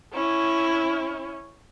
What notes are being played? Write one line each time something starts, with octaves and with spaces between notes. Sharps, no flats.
C#4 E4